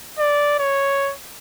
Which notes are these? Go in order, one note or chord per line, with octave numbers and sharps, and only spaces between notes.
D5
C#5